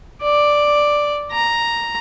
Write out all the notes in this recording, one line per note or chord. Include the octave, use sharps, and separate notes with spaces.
D5
A#5